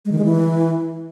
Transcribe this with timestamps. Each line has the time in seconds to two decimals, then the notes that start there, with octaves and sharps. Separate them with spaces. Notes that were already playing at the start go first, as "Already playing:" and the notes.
0.05 G#3
0.12 D#3
0.18 G#3
0.25 E3